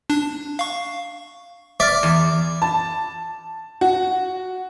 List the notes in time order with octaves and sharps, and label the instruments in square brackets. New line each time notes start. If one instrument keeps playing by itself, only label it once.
[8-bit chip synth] D4
F5 C#6
[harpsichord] D5 [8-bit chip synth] E5 F6
[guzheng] E2
[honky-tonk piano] A5
F#4